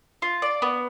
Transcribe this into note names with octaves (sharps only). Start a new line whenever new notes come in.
F4
D5
B3